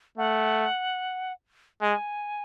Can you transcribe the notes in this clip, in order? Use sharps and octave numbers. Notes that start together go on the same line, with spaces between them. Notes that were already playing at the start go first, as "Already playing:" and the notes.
A3 F#5
G#3 G#5